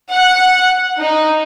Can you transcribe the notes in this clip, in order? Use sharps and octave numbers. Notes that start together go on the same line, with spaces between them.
F#5
D#4